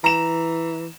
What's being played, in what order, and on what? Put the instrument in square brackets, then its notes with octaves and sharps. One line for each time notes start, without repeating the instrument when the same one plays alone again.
[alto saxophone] E3 [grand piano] A#5 E7